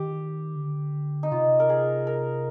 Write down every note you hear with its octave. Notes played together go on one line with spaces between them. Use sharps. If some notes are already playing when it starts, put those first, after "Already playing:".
Already playing: D#3 G4
D3
D#4
C3 F4
A#4
G#4
A#4